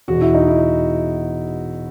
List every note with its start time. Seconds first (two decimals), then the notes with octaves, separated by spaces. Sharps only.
0.08 E1 E2 B2 F#4
0.21 E4
0.34 D#4
0.48 E4